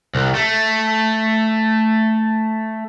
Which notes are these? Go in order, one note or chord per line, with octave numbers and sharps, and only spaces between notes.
C2
A3